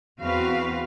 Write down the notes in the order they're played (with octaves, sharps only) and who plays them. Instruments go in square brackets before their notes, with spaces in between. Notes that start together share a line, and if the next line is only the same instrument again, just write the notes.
[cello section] E2 C4 F#4 B4 F5